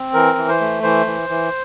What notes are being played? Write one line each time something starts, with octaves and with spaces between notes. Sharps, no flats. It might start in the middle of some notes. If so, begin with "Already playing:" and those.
Already playing: C4
E3 A#4
E3
C5
A3
E3 C5
E3
E3